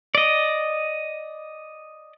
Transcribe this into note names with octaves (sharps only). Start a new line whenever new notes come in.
D5 D#5